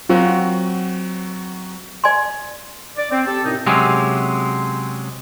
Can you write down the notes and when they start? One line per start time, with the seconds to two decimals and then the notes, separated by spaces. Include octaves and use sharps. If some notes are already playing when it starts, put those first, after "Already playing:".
0.09 F#3 C4 F4 F#4
2.04 D5 G#5 C6
2.97 D5
3.10 C4
3.26 G4 A4
3.44 F#2 A2 C3 C4 D#4
3.66 C3 F#3 G#3 C4 C#4